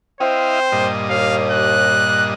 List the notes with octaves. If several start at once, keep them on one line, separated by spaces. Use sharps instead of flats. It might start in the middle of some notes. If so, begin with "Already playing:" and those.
C4 E4 C5 D#5 F5
G2 A#2 D#5
D#2 F5
F#6